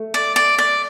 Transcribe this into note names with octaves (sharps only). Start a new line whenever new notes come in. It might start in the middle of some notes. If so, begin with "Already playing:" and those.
Already playing: A3
D5
D5
D5